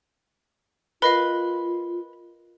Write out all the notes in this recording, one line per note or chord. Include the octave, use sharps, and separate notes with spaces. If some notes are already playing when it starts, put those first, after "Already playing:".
F4 A#4 B4 D#5 F5